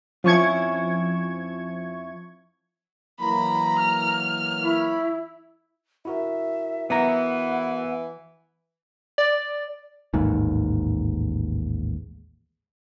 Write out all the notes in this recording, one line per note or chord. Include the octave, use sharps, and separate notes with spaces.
F2 F3 C#4 E4 C#6 G#6
E3 F#3 A#3 A#5 B5
F6
E4 C#5 B5
E4 F#4 A#4 E5
E3 B3 F#5 A#5
D5
A1 D#2 G#2